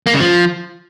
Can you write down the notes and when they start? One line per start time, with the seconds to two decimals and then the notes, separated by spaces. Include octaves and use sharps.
0.07 A#3
0.13 C#3
0.20 F3